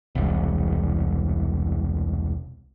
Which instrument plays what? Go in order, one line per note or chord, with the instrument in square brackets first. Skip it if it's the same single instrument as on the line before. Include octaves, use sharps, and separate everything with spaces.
[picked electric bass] E1 C2